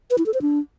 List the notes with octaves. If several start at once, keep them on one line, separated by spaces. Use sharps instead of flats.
B4
E4
A4
C5
D4